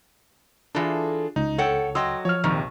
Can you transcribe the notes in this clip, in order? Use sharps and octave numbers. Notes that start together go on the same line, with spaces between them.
E3 D4 F4 G#4 A4
C#2 D#4
A4 C#5 F#5 G5 E6
F#3 D#5 G5 C6 E6
F3 C#5 F6
A#1 D#2 C3 D#3